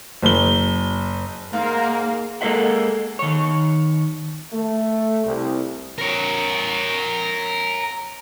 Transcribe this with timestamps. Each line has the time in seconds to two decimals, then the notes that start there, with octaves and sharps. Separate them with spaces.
0.23 F#1 G7
1.53 G#2 A#3 F5
2.41 G#3 A#3 A4 C5 E5 F#5
3.19 D#3 C#5
4.53 A3
5.25 C2
5.98 A#4 C#5